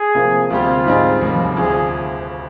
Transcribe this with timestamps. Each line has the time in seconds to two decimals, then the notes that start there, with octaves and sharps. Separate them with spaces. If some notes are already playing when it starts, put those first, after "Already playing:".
Already playing: G#4
0.15 C3 F3 A#3
0.50 D2 C3 G3 C4 F4 G4
0.86 G#2 G3 C4 D#4 G#4
1.21 F1 D#2 D#3 G3
1.57 D2 D3 F3 G#4